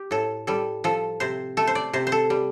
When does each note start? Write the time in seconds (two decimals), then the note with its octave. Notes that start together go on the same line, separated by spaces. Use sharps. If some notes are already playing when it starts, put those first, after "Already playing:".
Already playing: G4
0.11 A2 A4
0.47 G3 A4
0.84 F3 A4
1.20 C3 C5
1.57 A3 A4
1.67 C5
1.75 D5
1.93 C3 C5
2.07 C5
2.12 A4
2.30 G3